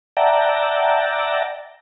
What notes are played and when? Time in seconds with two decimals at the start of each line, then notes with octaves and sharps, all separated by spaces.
0.17 D5 E5 F#5 G5 A5 A#5